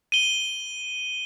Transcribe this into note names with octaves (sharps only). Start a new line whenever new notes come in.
D#7 G7